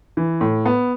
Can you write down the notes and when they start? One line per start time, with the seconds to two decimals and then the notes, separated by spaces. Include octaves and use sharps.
0.17 E3
0.41 A2
0.66 B3